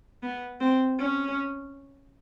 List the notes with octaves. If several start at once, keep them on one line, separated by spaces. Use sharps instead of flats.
B3
C4
C#4